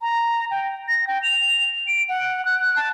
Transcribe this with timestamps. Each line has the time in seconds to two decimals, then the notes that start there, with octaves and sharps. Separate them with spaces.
0.02 A#5
0.51 G5
0.88 A#6
1.07 G5
1.23 F7
1.88 D7
2.09 F#5
2.45 F#6
2.76 A5